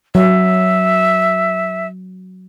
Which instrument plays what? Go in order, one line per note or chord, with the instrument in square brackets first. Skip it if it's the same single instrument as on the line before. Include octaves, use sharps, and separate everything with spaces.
[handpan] F#3 [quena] E5